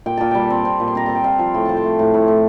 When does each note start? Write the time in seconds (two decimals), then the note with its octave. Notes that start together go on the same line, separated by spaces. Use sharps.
0.06 A#2 G5
0.17 A#2 A5
0.31 G3 G5
0.50 C4
0.65 C4
0.80 A#2
0.88 C6
0.95 C4 A#5
1.06 C4 A5
1.15 G5
1.24 C4 F5
1.39 F3
1.54 A2 G5
1.65 F3 A5
1.77 G5
1.84 A3
1.99 A2
2.14 A2
2.28 A2